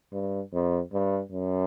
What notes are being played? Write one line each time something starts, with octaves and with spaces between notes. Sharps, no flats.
G2
F2
G2
F#2